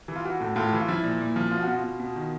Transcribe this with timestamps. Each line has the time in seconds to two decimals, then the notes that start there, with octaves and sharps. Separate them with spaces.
0.08 E3
0.16 F4
0.25 E3 F#4
0.41 A2
0.56 A2 F4
0.73 E3
0.81 F4
0.88 F3 E4
1.04 A#2
1.21 A#2
1.36 F3
1.51 B2 F4
1.63 B2 F#4
1.74 F4
1.84 B2
2.00 B2
2.16 D#3